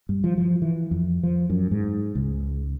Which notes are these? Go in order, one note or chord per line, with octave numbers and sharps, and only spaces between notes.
G2
F3
F3
E3
F2
F3
F#2
G#2
C#2